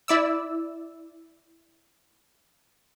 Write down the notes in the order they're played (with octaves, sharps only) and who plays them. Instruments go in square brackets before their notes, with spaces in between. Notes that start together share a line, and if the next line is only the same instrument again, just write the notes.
[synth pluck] E4 D5 E6